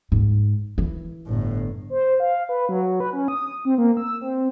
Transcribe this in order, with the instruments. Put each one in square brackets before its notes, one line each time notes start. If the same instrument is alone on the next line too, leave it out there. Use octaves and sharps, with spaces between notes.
[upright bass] G#2
E3
[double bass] G1 A2
[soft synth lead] C5
F5
B4
F#3
B4
C#4
D#6
C4
A#3
E6
C4